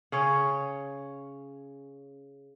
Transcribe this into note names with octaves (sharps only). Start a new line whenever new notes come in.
C#3 C#4 C#5